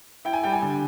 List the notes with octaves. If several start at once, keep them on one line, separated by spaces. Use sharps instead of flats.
E4 G5
G#5
G3 G5
G#5
D3